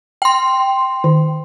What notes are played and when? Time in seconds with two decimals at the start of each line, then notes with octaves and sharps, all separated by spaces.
0.22 G5 C6
1.04 D#3